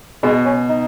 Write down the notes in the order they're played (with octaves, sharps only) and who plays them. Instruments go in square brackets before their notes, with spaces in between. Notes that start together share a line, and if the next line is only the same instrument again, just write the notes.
[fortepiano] B2 [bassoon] G#3
[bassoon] C#4
D#4